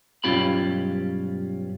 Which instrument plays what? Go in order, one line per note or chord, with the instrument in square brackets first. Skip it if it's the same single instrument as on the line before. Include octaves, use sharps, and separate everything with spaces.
[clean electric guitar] B1 G2 C#4 F4 G4 B5